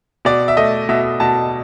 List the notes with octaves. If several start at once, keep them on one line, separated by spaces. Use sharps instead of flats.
B2 D5
E5
A3 D#5
B2 E5
B2 A5